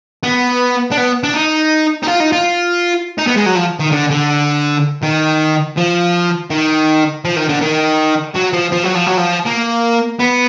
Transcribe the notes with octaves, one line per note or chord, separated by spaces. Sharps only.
B3
D4
B3
D4
D#4
D#4
F4
D#4
F4
D#4
B3
G#3
F#3
F3
D#3
D3
D3
D#3
F3
D#3
F3
D#3
D3
D#3
F#3
F3
F3
F#3
F3
F#3
F3
A#3
B3